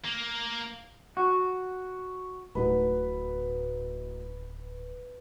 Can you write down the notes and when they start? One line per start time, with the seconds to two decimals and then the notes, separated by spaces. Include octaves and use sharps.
0.05 A#3
1.17 F#4
2.55 D1 A2 F#3 D#4 B4